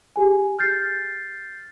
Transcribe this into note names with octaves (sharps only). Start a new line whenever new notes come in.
G4 G#4 G#5
F6 G6 A6 C7